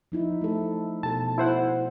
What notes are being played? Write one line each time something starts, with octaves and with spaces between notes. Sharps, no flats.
F3 D#4 E4
A3 A4
B2 A4 A5
E4 C5 F#5